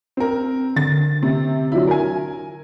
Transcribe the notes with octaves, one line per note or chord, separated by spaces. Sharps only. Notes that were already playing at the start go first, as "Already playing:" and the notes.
C4 A#4
D3 A6
C3
F#3 D4 E4
A#4 G#5